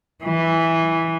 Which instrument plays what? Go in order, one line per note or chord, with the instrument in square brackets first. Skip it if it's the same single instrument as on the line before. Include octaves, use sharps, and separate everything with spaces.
[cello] E3